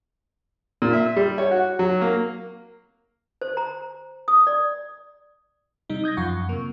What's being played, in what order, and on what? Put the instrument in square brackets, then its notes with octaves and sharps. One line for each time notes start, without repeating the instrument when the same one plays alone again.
[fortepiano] A#2
E5
G3
C#5
F#4
F#3
A#3
[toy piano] C5
A#5
D#6
D5
[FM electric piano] C3 G3 D#4
D#6 G6 G#6 A#6
F#2 F3 F4 F#5 C#6
C3 A#3